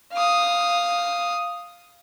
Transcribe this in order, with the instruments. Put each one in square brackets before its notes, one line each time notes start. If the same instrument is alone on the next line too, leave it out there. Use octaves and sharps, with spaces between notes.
[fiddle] F5 D#6